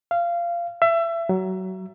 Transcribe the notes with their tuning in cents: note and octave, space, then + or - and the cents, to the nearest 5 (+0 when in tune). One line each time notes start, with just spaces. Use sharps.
F5 -20
E5 +25
F#3 +25